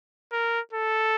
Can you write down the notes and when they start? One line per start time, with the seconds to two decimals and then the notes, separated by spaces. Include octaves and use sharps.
0.32 A#4
0.73 A4